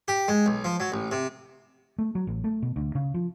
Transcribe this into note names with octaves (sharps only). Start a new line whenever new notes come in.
G4
G#3
B1
F3
F#3
A1
C3
A3
F#3
A1
A3
B2
D2
C#3
F3